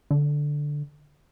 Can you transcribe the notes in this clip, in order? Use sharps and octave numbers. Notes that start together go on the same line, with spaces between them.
D3